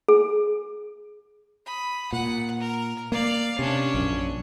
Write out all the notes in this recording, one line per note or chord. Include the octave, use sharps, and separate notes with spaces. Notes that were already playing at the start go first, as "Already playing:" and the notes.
G#4
B5 D#6
A#2 F#5
A#4
A#3 D5 F5
C3 C#4 D4
A#1 F#2